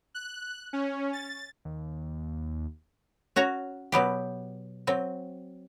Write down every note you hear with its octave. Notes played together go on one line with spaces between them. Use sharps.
F#6
C#4
A6
D#2
C#4 F#4 C#5 A#5
B2 F#3 B3 G4
F#3 C4